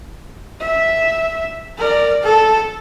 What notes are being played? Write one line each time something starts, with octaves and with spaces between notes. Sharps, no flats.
E5
A#4 D5
A4